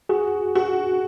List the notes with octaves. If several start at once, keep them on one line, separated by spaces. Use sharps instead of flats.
F#4 G#4
F#4